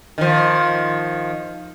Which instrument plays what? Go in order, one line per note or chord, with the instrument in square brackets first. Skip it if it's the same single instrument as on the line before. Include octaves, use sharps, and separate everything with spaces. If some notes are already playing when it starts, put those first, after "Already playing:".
[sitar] D#3 F3